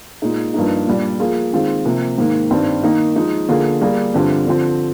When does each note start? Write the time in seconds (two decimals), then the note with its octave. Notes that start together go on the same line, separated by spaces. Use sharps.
0.22 A#2 G#3 D#4 G#4
0.54 G2 F3 A#3 D#4
0.87 A#2 G3 D4
1.20 F3 A#3 F4 G#4
1.53 D#3 G#3 C4 F4
1.85 C3 F3 A#3
2.18 G#2 D#3 A#3
2.51 G2 D#3 G3 C4
2.83 D#3 A#3 D#4
3.16 F3 G#3 D#4 G#4
3.49 D3 F3 A#3 F4 G#4
3.81 G3 A#3 F4 G#4
4.14 G2 D3 F3 C4 G4
4.47 D3 F3 C4